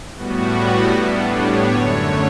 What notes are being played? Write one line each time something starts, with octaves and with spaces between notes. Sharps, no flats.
A2 G3 B3 F#4
A2 G3 B3 D4
C#5
F#2 D3 A3